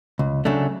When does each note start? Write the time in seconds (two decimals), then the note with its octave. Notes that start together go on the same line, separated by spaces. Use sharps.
0.19 C#2
0.45 C#3 F#3 A3 D4